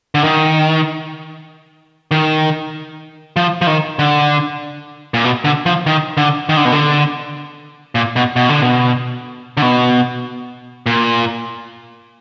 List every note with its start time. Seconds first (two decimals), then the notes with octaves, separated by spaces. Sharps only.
0.15 D3
0.24 D#3
2.11 D#3
3.36 F3
3.61 F3
3.67 D#3
3.99 D3
5.14 A#2
5.24 B2
5.44 D3
5.66 F3
5.86 D#3
6.17 D3
6.49 D#3
6.57 D3
6.65 B2
6.72 D3
7.95 A#2
8.16 B2
8.36 B2
8.49 D3
8.62 B2
9.57 D3
9.62 B2
10.86 A#2